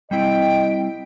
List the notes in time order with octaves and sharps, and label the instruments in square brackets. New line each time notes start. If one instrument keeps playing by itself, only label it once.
[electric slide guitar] G3 C4 E4 [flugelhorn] D#5 [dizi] G5